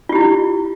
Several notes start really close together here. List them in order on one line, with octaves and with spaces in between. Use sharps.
F4 G4 E4